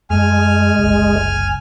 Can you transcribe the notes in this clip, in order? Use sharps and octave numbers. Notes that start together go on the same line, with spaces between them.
F#2 G#3 A3 G#5 F6
F#1 C2